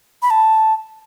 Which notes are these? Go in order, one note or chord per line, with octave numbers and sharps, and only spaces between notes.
B5
A5